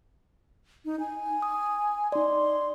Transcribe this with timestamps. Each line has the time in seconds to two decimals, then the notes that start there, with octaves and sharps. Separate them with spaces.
0.85 D#4
1.00 G#5
1.42 D#6
2.12 D#4 D5 C6